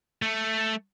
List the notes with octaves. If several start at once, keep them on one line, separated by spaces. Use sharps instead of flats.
A3